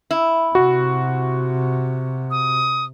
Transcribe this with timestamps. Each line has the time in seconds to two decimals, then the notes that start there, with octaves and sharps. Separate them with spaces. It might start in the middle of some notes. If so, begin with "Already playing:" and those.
0.11 E4
0.55 C3 F#4
2.31 D#6